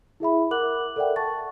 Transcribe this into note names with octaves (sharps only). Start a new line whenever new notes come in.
E4 G#4 E5 B5
A#4 F#5 D6 F#6 F#7
A4 A#4 D5 E5 F#5 G5
A5 C#6 A6